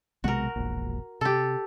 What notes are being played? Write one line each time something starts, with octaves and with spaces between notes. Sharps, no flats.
B1 C3 G#3 F#4 A#4
E1 A#1
C3 G4 A4